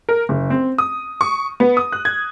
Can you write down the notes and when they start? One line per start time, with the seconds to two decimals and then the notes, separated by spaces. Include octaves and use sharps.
0.09 A#4
0.29 F#1
0.50 C4
0.78 D#6
1.21 C#6
1.60 B3
1.77 D#6
1.92 F#6
2.05 G#6